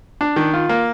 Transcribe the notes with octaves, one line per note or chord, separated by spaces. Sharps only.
D4
D#3
F4
A#3